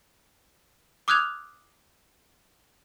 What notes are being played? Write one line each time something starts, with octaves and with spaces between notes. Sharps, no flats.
D6 D#6 F6 F#6 G#6 F7